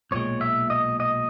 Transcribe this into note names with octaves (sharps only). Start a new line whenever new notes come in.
B1 A#2 G#3 C#5
E5
D#5
D#5